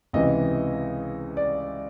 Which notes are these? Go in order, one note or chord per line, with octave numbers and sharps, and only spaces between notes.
C#2 C3 E3 D#5
D5